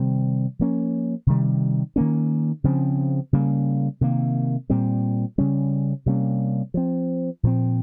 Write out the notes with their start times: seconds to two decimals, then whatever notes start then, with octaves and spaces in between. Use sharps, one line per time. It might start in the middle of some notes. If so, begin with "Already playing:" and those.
Already playing: C3 D#3 G3 C4
0.59 F3 A#3 C#4
1.27 C3 D#3 G3
1.96 D#3 A#3 C#4
2.64 C#3 F3 C4
3.33 C#3 G3 A#3
4.01 C3 D#3 A#3
4.70 A#2 G3 C4
5.38 C#3 G3 C#4
6.06 C3 G3 A#3 C#4
6.74 F3 C4
7.43 A#2 F3 C4